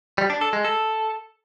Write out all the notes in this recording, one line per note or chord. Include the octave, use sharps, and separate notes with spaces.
G3
D4
A4
G#3
A4